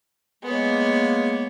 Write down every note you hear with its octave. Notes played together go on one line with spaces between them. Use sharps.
G#3 A#3 B3 C#5